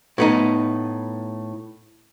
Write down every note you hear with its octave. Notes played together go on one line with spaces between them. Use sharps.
A2 B3 D#4